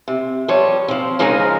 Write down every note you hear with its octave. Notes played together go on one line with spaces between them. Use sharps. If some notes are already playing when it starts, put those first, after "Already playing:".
C3
F3 G3 C#5
F3 C4
C#3 F3 G#3 D#4 G#4 A#4